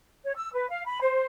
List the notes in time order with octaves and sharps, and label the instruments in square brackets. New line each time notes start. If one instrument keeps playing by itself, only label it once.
[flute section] C#5
E6
B4
F5
B5
C5